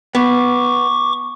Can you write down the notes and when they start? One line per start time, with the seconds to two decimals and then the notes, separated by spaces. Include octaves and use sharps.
0.15 B3 C#6 D6